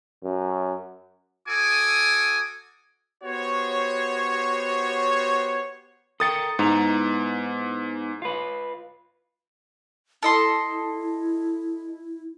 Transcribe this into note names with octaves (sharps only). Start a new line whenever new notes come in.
F#2
F#4 A4 G#5 D6 D#6
B3 F#4 G4 C5 C#5
A4 A#4 G5 D#6 A6 C#7
G#2 B3 E4 A#5
F4 B4
E4 A4 D#5 C6